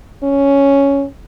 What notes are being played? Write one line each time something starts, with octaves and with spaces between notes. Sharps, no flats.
C#4